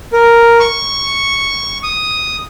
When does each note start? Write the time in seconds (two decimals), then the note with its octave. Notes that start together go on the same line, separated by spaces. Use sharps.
0.13 A#4
0.60 C#6
1.83 D#6